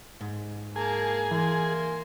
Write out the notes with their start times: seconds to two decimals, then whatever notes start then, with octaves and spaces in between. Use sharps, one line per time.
0.21 G#2
0.76 A#3 G#4 A5 A#5
1.31 E3 A#3 C6